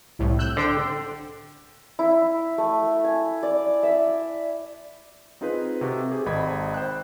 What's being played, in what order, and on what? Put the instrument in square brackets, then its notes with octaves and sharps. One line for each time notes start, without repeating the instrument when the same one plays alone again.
[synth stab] C2 A2
E6 F#6 G6
[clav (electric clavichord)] D3 [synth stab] C5 G5
[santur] E4
A3
G#5
D5
E5
[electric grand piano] C4 D#4 F4 G#4 B4 C5
C3 F#4 A4
G4 G#4 C5
G#1 D#5 B5 G#6
C5 G5 F#6